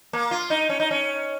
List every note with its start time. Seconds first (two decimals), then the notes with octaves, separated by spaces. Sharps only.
0.13 A#3
0.31 F4
0.50 D#4
0.69 C#4
0.80 D#4
0.91 C#4